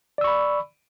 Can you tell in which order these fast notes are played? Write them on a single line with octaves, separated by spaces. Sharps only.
D5 E6 C#6 B5